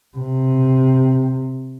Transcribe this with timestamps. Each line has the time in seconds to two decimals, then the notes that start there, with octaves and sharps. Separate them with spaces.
0.17 C3